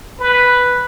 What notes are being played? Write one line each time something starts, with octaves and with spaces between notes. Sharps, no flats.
B4